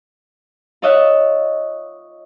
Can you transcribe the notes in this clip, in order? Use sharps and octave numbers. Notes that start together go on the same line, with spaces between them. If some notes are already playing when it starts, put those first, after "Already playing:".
F4 C#5 D#5 E5 F#5